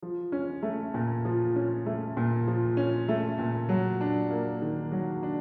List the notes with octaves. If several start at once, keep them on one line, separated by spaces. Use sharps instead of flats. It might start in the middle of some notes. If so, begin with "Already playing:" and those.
F3
C#4
A3
A#2
F3
C#4
A3
A#2
F3
C#4
A3
A#2
F#3
D4
A#3
D#3
F#3
D4